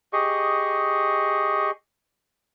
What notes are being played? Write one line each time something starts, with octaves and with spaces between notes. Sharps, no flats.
G4 G#4 D#5 C#6